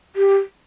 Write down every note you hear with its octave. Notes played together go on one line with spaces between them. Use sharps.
G4